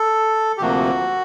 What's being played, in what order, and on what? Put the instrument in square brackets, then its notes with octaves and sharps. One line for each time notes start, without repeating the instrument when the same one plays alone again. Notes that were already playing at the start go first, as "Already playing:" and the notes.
Already playing: [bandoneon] A4
G4
D2 C3 F3 A#3 F#4